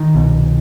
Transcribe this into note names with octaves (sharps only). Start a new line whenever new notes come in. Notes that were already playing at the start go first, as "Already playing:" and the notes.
Already playing: D#3
C2 B2